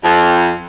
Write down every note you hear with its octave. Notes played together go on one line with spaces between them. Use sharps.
F2